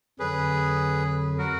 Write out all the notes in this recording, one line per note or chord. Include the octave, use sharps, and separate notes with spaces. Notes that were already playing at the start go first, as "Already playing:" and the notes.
F2 D3 F#3 G#4 B4
F#4 A#4